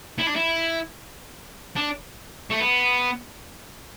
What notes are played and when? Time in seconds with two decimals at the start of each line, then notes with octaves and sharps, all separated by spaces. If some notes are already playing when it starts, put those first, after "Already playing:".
0.19 E4
0.27 D4
0.36 E4
1.76 D4
2.50 A3
2.59 B3